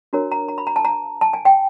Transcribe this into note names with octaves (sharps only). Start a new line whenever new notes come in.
D4 F#4 A#4 C#5 A#5
A#5
A#5
B5
A#5
A5
A#5
A5
G#5
G5